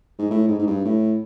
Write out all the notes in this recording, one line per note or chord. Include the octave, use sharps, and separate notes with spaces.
G#2
A2
G#2
G#2
G2
A2